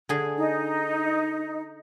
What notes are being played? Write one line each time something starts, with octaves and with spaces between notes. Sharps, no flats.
D3 G#4
D#4